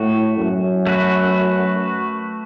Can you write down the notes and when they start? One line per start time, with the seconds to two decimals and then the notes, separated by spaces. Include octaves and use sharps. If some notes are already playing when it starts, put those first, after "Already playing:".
Already playing: A2 A3 F#4
0.37 F#2
0.87 A3 F#4 B4